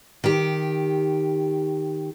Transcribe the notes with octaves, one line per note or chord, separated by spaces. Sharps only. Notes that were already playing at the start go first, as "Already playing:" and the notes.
D#3 G4